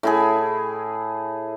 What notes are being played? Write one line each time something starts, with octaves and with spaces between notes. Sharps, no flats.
A2 E4 G#4